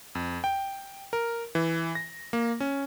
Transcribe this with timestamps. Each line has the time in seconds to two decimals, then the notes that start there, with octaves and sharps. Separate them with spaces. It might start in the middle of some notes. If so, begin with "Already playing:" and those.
0.15 F2
0.44 G5
1.13 A#4
1.55 E3
1.95 A#6
2.33 A#3
2.60 C#4